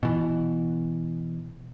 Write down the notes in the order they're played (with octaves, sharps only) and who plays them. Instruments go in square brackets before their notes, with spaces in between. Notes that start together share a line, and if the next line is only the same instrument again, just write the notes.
[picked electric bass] B2 E3